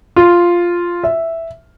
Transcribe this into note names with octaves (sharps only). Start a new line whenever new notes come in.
F4
E5